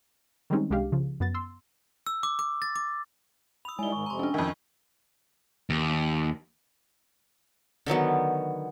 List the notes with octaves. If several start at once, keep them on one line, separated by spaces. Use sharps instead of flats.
D#3 G3 G#3 C4 C#4 D#4
C2 G#3 D4 G4 F5
C#3 F3
F#2 B3 A6
C6 E6
E6
D6
D6
A6
D6
B5 D#6 E6 F7
D#3 G3 G#3 E4 G#5 G7
G#2 D#3 C#6
F2 C3 A#5 C6
C#4 D4
F2 D#3 E5 G5 G#5
D#2
D3 D#3 F#3 B3